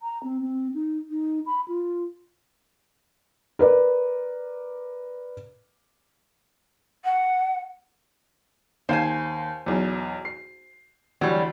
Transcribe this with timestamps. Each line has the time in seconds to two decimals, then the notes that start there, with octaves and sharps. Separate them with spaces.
0.01 A#5
0.23 C4
0.42 C4
0.74 D#4
1.11 D#4
1.46 B5
1.68 F4
3.59 A#4 B4 D5
7.04 F#5
8.89 D#2 C5 F5 G#5
9.66 B1 E2
10.25 C7
11.21 D2 E3 F#3 G3